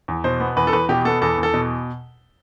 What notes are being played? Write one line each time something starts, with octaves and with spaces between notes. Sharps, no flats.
E2
B2 C5
B3
E2 B4
A4
E2 B4
B2 G4
B3 A4
E2 A4
E2
A4
B2